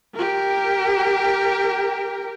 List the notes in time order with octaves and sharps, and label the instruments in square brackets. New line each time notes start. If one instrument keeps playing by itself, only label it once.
[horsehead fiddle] G4 A#4